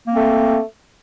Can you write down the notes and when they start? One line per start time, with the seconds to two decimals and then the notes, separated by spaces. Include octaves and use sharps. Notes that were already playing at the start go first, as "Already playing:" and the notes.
0.06 A#3
0.10 C4
0.14 A3